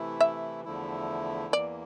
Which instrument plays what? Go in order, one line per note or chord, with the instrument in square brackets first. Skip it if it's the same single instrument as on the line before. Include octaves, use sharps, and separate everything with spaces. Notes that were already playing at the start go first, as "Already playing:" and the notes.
Already playing: [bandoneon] C3 E3 A3 E4
[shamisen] E5
[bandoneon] E2 D3 F3 A3 E4
[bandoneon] E2 E3 A#3 [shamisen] D5